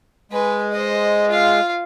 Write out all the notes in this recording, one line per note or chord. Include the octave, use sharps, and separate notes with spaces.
G#3 B4 G#5
C5 D#5
F4 F5